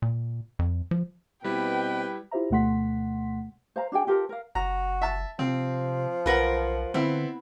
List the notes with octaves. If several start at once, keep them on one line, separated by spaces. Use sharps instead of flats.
A#2
F2
F3
B2 G3 C4 E4 B4 G5
E4 F4 G4 C5 E5 A#5
D2 B2 A3 F#5 C6 B6
C5 F5 A#5
D4 F#4 G#4 G5
F4 G4 A4 A#4
A#4 F5
F#1 F#4 A#5
E5 A5
C3 F3 C4
B1 F4 A#4 B4 F#5
D3 B3 C4 E4